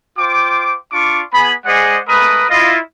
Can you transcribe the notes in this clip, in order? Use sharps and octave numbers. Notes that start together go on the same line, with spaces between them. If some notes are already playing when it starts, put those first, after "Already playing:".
F4 C5 G5 D6
D4 F4 C#6 D6
B3 G#4 G#5 B5
G#3 G#4 C5 D5 D#5 F#5
G#3 A3 A#4 B4 B5 D#6
E4 F4 D#5